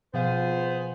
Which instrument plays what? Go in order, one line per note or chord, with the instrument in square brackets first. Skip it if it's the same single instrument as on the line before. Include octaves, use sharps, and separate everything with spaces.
[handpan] B2 F3 F5 [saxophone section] B3 G#4 C5